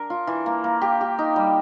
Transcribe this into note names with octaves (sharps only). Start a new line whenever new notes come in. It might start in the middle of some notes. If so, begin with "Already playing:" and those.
Already playing: D4 A#4
F4
E3
A#3
A#3
G4
G4
D#4
G3